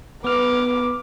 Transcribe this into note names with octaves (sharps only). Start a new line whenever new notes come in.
B3 B4 D6 F6